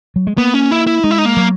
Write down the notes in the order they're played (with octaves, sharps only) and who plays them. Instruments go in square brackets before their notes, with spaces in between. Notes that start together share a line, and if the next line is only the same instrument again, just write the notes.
[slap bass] F#3
G#3
[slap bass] A#3 [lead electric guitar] B3
[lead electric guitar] C#4
E4
E4
[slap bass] G#3 [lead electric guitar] D#4
[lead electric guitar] E4
D#4
A#3
[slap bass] F#3